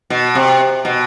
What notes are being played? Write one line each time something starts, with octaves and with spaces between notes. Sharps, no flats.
B2
C3
B2